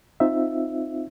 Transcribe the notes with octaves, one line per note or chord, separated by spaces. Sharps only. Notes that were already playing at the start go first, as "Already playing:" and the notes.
C4 D#4 F4 E5